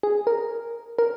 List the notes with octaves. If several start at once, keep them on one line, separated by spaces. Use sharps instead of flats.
G#4
A#4
A#4